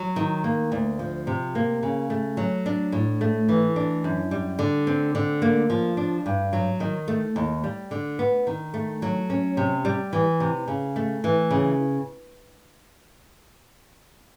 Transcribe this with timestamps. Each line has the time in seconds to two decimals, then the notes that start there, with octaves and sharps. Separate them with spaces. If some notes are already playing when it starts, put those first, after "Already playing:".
Already playing: F#3
0.16 D#3
0.44 A#3
0.72 D2
0.99 F3
1.27 C3
1.55 A#3
1.83 C#3
2.10 A3
2.37 F#3
2.66 D4
2.92 A2
3.21 A3
3.49 E3
3.76 D4
4.04 F#2
4.31 G3
4.59 D3
4.87 C4
5.15 D3
5.42 A#3
5.70 F3
5.97 D4
6.26 G2
6.53 F#3
6.80 D#3
7.08 A3
7.36 D#2
7.64 G3
7.91 D3
8.19 B3
8.47 D#3
8.74 A3
9.02 F#3
9.30 C#4
9.57 C3
9.85 G3
10.13 E3
10.40 C3
10.68 C#3
10.96 A3
11.24 E3
11.51 C#3